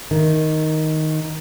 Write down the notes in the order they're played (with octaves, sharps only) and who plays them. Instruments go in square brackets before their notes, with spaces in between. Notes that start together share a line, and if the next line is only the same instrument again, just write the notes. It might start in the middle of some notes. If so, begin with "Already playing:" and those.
[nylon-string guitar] D#3